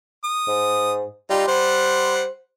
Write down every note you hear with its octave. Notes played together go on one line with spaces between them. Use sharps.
D#6
G#2
G3 D#4 F4
G3 C5 F#5 C6